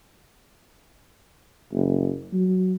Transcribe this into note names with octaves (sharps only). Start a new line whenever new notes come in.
F#1
F#3